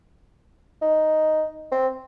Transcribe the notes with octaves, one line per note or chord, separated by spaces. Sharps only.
D#4
C4